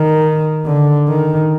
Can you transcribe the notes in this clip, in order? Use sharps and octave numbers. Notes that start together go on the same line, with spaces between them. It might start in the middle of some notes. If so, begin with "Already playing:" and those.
Already playing: D#3
D3
D#3